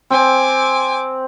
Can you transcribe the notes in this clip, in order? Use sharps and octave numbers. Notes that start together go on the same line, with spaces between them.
C4 G#5 D6